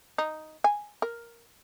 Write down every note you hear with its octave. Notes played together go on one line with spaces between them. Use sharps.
D#4
G#5
A#4